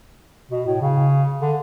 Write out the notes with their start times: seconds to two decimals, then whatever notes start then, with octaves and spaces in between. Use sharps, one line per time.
0.52 B2
0.66 A2
0.81 C#3
1.41 D3